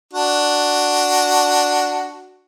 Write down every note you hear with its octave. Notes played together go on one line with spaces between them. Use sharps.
D4 F#4